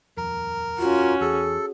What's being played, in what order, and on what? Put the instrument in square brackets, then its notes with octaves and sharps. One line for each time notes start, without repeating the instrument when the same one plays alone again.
[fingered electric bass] D#1 F2 [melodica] A#4
[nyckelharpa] C#4 F#4 [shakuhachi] F4
[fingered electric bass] E2 [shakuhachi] G#4 [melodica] A4